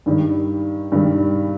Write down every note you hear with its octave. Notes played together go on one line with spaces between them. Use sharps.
G2 D#3 G3
G2 D#3 G3